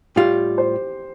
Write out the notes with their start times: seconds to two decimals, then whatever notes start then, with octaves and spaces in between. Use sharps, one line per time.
0.16 A2 G3 F4 G4
0.58 C5